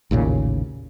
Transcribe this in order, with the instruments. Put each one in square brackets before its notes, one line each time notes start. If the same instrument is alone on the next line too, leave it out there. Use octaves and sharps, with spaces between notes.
[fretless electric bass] A1 D#2 A#2 C#3